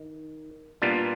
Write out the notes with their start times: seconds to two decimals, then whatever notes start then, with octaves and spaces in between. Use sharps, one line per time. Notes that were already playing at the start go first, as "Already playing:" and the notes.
Already playing: D#3
0.82 A#2 G3 B3 D4 F4